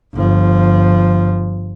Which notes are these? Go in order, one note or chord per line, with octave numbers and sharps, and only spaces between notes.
G1 F3